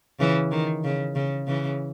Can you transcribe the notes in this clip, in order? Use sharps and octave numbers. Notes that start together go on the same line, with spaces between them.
C#3 E3
D#3
C#3
C#3
C#3 E3